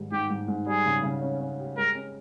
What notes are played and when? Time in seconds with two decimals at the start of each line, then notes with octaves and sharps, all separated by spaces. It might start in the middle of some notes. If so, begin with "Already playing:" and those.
Already playing: G#2 D#3 G3
0.12 G#2 G4
0.30 G#2
0.48 G#2
0.66 G3 G#4
0.86 C#3
1.03 C#3
1.21 C#4
1.40 C#4
1.59 G4
1.77 G#3 A#4
1.95 C#4